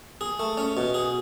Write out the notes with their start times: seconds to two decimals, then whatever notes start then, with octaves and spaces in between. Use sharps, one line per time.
0.21 G#4
0.39 A3
0.57 C#4
0.77 B2
0.94 G#4